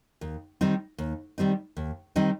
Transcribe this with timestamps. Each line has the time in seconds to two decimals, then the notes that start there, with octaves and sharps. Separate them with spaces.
0.21 D#2
0.61 D#3 G3 C4 D#4
0.98 D#2
1.38 D#3 G3 C4 D#4
1.77 D#2
2.16 D#3 G3 C4 D#4